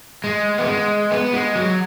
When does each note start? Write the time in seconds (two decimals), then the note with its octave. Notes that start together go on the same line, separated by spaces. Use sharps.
0.24 G#3
0.58 B3
0.67 G#3
1.11 B3
1.34 G#3
1.56 F#3